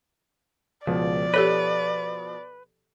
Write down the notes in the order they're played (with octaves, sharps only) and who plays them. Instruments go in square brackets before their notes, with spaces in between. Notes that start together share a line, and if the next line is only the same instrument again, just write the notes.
[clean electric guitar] C#2 [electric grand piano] B2 F3 [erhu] D5
[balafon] G4 A4 C#5 [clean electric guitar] B4